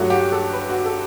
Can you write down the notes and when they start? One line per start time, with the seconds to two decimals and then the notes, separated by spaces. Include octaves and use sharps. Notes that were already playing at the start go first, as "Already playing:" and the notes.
Already playing: G2 F#3 A3 F#4
0.10 G4
0.32 A4
0.53 B4
0.69 F#4
0.86 A4